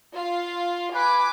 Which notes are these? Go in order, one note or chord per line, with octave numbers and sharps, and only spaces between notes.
F4 F5
B4 G#5 D6